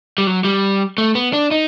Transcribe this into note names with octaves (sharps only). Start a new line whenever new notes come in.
G3
F#3
G3
A3
B3
D4
D#4